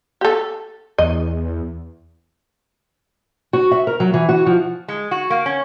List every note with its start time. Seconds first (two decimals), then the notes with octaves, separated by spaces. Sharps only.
0.21 G4 A4
0.98 E2 D#5
3.53 F#4
3.72 E5
3.87 A#4
4.00 F#3
4.14 E3
4.29 F#4
4.46 F3
4.88 G#3
5.11 F#4
5.30 A#3
5.46 C#4